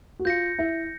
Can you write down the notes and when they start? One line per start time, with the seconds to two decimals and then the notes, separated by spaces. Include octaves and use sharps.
0.19 F#4
0.25 F4 G6 A#6 C#7
0.59 E4